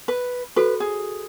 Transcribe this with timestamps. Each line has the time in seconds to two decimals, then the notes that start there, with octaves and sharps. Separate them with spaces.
0.08 B4
0.56 F#4 A4 B4 C5
0.80 G#4